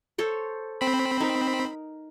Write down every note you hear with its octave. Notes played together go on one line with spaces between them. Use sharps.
A4 C5 C#5
C4 B5
D#4 A#4